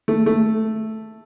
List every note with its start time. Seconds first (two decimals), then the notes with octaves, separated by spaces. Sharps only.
0.08 A3
0.26 A3